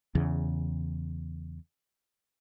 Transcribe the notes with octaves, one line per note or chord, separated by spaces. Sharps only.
E2 C#3